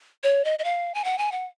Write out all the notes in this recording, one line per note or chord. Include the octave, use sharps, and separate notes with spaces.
C#5
D#5
D#5
F5
G#5
F#5
G#5
F#5